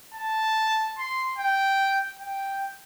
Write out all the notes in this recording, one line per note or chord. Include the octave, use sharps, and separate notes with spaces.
A5
C6
G5
G5